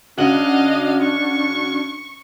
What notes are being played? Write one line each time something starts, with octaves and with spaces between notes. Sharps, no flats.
C#3 D4 F#4 D#5 F5 F#7
C#6